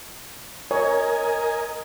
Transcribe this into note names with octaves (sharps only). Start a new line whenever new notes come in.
A#4 C#5 D#5 G#5